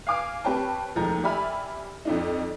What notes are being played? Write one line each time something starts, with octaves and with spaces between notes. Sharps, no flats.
F5 G#5 D6 F6
C4 G4 B4 C#5 G5 A5
F1 D#2 F3 G#3 A#5
G4 D5 E5 G#5 B5 F6
F2 D4 D#4